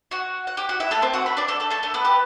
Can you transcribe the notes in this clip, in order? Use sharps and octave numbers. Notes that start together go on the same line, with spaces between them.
F#4 F#5
F#5
G4 G5
F#4 F#5
E4 E5
A3 A4
C4 C5
F#4 F#5
B4 B5
D4 D5
A3 A4
A3 A4
A3 A4
A3 A4
B3 B4
G4